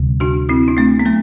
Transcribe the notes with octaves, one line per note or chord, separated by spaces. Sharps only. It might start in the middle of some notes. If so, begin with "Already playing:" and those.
Already playing: D2 C3 G3
D4 F#4
C4 E4
D4
A3 C4
B3
F#3 A3